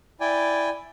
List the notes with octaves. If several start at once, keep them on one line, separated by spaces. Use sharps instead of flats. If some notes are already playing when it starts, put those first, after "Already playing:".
E4 D5 G5 G#5